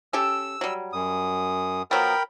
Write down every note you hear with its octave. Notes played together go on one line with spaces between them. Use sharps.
C#4 G4 A4 E6
F#3 G3
F#2 D#6
F3 F#3 B3 A#4 G5 B5